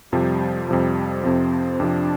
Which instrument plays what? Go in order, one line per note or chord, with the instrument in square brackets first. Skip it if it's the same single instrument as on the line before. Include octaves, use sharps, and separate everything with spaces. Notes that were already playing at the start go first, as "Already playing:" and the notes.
[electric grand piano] F2 C3 F3 [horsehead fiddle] G3
[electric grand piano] F2 C3 F3 [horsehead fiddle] G3
[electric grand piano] F2 C3 F3 [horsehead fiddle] C4
[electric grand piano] F2 C3 F3 [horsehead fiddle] D4